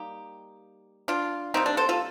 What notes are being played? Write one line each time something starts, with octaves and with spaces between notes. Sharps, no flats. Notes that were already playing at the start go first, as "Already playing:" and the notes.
Already playing: G3 A#3 D#4 G4
D4 F4
C3 G3 A#3 C4 D#4
D4
A4 C5
F4 A4